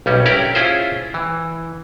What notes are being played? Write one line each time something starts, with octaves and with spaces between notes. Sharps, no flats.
B1 G3 C#4
C#4 E4 G4 A#4 D5
C#4 E4 F4 G#4 C5
E3